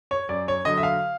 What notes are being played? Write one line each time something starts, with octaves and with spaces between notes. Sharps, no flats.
C#5
F#2 D5
C#5
D3 F#3 D#5
E5
F5